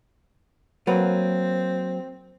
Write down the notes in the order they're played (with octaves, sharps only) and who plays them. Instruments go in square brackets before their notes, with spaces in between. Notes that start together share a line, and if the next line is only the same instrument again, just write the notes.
[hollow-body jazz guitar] F#3 A#3 B4 [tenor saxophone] C4